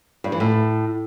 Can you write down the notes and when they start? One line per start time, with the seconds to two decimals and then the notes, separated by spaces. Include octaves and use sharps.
0.24 G2
0.32 E3
0.40 A2